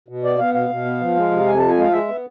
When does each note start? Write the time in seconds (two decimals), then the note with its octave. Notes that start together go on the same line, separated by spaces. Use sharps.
0.08 B2
0.24 B3 D5
0.39 B3 F5
0.54 B2 F5
0.70 B2
0.85 B3
1.01 F3
1.15 G#3
1.31 C3
1.46 F2 G#5
1.58 F3 A5
1.69 G#5
1.77 G#3 F5
1.92 G#3 E5
2.08 B3